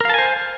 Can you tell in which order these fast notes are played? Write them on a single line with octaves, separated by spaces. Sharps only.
A#4 F5 A5 G#5 C5